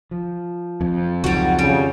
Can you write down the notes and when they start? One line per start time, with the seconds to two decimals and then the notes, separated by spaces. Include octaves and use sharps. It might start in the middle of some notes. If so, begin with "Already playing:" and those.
0.11 F3
0.81 F2
1.24 C#2 D#3 F#3 G3 F#4
1.59 C#3 G3